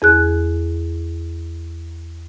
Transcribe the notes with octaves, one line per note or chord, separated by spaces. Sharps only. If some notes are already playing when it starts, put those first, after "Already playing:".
E2 G#4 F#6